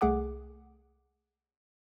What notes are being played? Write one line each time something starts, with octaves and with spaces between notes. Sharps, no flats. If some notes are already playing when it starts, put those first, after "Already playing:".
C2 A3 G#4 F#5 D6